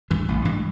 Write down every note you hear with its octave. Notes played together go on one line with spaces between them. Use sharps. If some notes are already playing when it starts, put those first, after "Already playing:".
G2 E3 G#3
A1
G2 E3 G#3